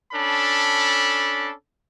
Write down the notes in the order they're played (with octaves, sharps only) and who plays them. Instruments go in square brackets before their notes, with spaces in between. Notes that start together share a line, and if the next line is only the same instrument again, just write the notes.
[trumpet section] C#4 D4 A4 B5